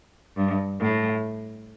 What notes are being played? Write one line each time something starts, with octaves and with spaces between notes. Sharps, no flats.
G2
A2